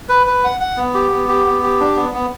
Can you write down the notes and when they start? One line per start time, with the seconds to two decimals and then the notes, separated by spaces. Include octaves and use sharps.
0.09 B4
0.27 B4
0.44 F#5
0.60 F#5
0.77 B3
0.94 G4
1.12 B3
1.29 G4
1.46 B3
1.63 G4
1.80 D4
1.96 B3
2.14 B3